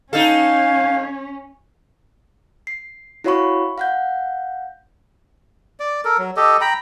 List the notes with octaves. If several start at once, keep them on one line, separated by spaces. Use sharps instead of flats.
C#4 D#4 A4 F5
C7
E4 F#4 C#5 F5 B5 C#6
F5 F#5 G6
D5
A4 A#4
F#3
G4 A4 D#5
G5 A#5 B5